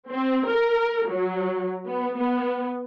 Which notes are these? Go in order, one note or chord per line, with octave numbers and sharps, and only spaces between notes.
C4
A#4
F#3
B3
B3